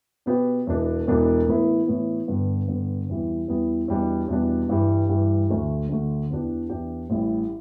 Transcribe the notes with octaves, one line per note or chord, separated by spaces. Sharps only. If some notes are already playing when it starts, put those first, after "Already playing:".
B2 B3 G4 B4
E1 E2 B2 B3 D4
E1 E2 B2 B3 D4
A2 E3 B3 E4 B4
A2 E3 B3 E4 B4
G2 D3 B3
G2 D3 B3
E2 E3 G3 B3
E2 E3 G3 B3
E2 B2 G3 D4
E2 B2 G3 D4
G2 E3 G3
G2 E3 G3
D2 D3 A3
D2 D3 A3
E2 E3 B3 D4 G4
E2 E3 B3 D4 G4
A1 A2 G3 E4